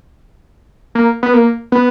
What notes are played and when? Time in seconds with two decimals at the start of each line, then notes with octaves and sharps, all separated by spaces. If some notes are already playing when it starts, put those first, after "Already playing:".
0.95 A#3
1.23 B3
1.34 A#3
1.72 B3